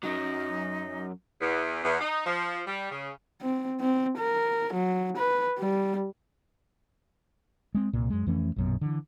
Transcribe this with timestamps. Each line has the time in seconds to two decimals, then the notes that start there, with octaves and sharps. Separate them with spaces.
0.03 F#2 F#3 D#4
1.41 E2
1.83 E2
1.99 D#4
2.25 F3
2.66 G3
2.90 C#3
3.41 C4
3.81 C4
4.18 A#4
4.73 F#3
5.17 B4
5.59 G3
7.75 G#3 C4
7.93 C2 A#2
8.10 F#2 G#3
8.27 F2 E3 A3 C#4
8.56 A#1 F#2 B2
8.81 D3 E3